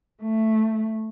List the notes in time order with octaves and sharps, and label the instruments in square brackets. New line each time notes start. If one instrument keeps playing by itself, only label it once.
[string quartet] A3